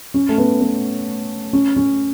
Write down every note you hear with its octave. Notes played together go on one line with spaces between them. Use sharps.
C#4
A3
B3
B3
C#4
C#4